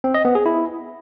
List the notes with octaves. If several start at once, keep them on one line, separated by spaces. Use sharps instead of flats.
C4
D#5
B3
G#4
E4